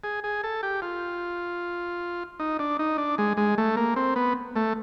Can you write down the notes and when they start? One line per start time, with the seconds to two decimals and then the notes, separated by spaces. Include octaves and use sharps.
0.04 G#4
0.24 G#4
0.44 A4
0.63 G4
0.82 F4
2.40 D#4
2.59 D4
2.79 D#4
2.98 D4
3.18 G#3
3.37 G#3
3.58 A3
3.76 A#3
3.96 C4
4.16 B3
4.56 A3